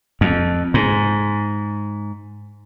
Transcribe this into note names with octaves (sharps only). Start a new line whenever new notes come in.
F2
G#2